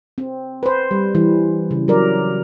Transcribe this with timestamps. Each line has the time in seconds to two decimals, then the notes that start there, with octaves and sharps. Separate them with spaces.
0.18 C4
0.63 B4 C5
0.91 G3
1.15 E3 G3
1.71 C#3
1.88 F#3 A#4 D5